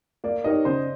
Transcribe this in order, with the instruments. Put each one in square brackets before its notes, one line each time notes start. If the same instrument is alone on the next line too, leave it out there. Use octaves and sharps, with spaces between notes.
[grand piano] A#3 [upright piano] D5
[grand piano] D#4 G4 A#4 C#5 [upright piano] D#5
[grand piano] C#3 [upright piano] C5